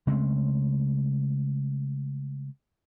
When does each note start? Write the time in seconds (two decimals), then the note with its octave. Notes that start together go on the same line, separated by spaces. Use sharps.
0.07 C#3 G#3 A3 C4